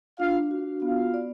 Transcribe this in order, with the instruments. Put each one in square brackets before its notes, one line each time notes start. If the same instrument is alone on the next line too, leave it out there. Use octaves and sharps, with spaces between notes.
[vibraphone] D4 [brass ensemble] F4 F5
[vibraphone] F#4
[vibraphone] B3 [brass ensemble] F4 F5
[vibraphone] D5